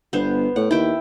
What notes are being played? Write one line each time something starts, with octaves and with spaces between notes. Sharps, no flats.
G1 B3 C5
A2 F#5
D#2 E4 G5